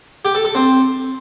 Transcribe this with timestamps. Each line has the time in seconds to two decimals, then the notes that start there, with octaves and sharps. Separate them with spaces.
0.25 G4
0.35 A4
0.45 A4
0.55 C4